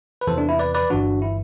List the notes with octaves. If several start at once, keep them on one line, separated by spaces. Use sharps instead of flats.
B4
E2 C3 E3 A4 C5
D4
E4
B4 D5
B4 D5
G1 G2 E3 D4 F#4
E4